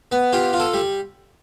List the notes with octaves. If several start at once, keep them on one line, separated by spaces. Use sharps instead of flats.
B3
F4 G4
F4
A4
G3